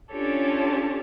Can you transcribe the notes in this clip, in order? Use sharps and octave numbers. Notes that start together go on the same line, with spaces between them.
C#4 D4 F4 G4 A4 C#5